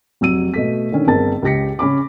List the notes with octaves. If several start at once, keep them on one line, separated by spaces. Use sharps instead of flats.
F1 F#3 E6 D#7
B2 A3 B6
D3 D#3 C#4
G1 C4 G#4 A#4 A5 A6
C#2 C#3 G4 A#6 B6 C#7
C#3 C#4 B5 D6